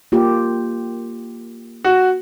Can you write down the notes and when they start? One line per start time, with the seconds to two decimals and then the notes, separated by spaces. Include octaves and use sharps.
0.12 A#3 F4 G4
1.84 F#4